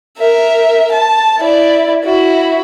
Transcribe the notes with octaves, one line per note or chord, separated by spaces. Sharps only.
A#4 E5
A5
E4 D5
E4 F#4